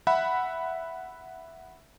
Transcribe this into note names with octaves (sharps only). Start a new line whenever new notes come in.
E5 F#5 B5